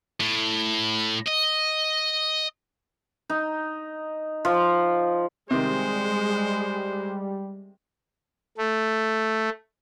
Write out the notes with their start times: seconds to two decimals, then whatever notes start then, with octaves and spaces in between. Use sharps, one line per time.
0.20 A2
1.26 D#5
3.30 D#4
4.45 F3
5.51 C3 D#3 G3 G#3 C5
8.58 A3